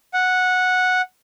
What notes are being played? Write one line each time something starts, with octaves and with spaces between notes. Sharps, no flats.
F#5